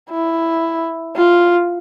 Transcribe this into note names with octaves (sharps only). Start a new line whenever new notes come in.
E4
F4